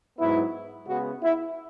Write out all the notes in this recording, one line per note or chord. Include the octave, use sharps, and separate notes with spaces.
G#2 F#3 B3 E4
C#3 G#3 B3 F#4
E4